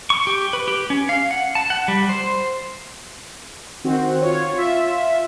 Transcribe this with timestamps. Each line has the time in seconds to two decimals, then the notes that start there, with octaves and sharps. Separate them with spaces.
0.10 C#6
0.27 G4
0.53 B4
0.68 G4
0.90 C#4
1.09 F5
1.31 F#5
1.55 A5
1.70 F#5
1.88 G3
2.09 C5
3.84 D#3 C4 F#4
4.22 F4 C#5
4.54 F4 E5